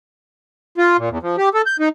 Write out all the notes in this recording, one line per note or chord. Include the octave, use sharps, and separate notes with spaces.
F4
A#2
E2
F3
G4
A4
G6
D#4